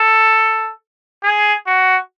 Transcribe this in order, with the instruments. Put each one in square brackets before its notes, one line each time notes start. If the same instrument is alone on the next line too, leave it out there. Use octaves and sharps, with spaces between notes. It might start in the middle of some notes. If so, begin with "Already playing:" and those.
Already playing: [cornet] A4
G#4
F#4